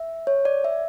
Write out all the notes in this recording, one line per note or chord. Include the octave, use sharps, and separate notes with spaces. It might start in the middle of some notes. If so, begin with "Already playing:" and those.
Already playing: E5
C#5
D5
E5